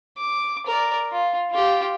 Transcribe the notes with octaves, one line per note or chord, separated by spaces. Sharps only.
D6
A#4 D5
F4
F4 G4